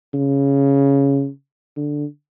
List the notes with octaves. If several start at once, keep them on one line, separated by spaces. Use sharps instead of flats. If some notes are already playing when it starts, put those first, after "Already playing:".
C#3
D3